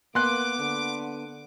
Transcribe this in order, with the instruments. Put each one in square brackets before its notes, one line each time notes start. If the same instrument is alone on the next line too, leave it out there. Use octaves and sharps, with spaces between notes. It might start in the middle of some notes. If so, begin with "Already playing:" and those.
[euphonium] A#3 [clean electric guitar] B3 [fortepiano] C6 F#6 [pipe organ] D6
[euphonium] D3